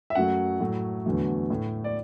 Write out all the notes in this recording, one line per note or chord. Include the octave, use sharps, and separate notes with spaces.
E5
F#2 F#3 A3 F#5
A2 F#3 A3
E2 D3 F#3 A3
A2 A3
D5